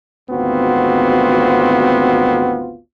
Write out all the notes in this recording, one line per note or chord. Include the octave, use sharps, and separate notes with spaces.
G#1 D2 B3 C4 F4 F#4